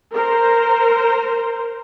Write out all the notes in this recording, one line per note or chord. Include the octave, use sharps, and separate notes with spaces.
A#4 C5